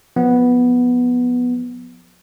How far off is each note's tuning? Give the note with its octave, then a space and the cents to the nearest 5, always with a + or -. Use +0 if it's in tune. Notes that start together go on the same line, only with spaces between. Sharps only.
F3 +25 B3 -5